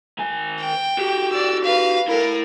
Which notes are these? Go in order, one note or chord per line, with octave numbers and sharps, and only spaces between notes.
D#3 G#5
G5
F#4 G4
D5 E6
B4 F5
E4 A4 A#4